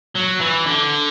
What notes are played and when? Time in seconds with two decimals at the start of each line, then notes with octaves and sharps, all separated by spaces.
0.15 F#3
0.40 E3
0.66 D3